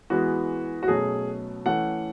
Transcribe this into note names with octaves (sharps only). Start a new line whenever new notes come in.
E3 G#3 B3 F#4
F#4
B2 F#3 A3 C#4 G#4
E3 A3 C#4 F#5